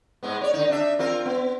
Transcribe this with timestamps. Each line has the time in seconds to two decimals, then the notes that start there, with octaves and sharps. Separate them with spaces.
0.23 G#2 G#3 B3
0.41 C#5 D5
0.54 D3 D#4
0.69 D4 D#4 E5
0.99 C4 F4 A#4
1.25 B3